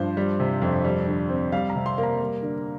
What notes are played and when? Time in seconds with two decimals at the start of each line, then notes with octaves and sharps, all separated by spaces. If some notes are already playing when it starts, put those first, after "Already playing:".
Already playing: G2 F3 C5
0.17 G3
0.40 C3
0.62 F2
0.85 G3
1.07 D3
1.30 C4
1.52 G3 F5
1.70 A#5
1.75 C3
1.86 C6
1.98 A#3
2.03 A#5
2.20 G3
2.42 D3